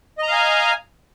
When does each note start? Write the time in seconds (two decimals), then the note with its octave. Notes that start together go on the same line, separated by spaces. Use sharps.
0.18 D#5
0.23 A#5
0.28 F5
0.32 G#5